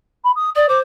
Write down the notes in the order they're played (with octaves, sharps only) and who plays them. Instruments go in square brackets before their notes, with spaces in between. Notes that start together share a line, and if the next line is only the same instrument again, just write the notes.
[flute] B5
D#6
[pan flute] D5 [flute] D#6
[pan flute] C5 [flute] D6